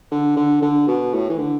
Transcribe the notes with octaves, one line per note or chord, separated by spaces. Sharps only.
D3
D3
D3
B2
A2
E3
D3